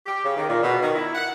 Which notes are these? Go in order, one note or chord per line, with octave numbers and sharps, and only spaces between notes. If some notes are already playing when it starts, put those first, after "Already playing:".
G4
C#3
D#3
A#2
B2
D#3
E4
F#5